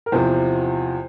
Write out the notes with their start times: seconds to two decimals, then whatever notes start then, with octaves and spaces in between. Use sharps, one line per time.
0.06 A#4
0.12 E2 C3 F3 C5